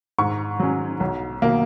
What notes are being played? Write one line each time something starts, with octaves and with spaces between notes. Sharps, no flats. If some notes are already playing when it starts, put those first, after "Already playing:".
G#2 C#6
F#3 C#4
B1
B2 A#3